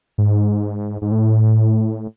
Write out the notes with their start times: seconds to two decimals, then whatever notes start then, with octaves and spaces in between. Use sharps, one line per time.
0.18 G#2
1.02 G#2
1.11 A2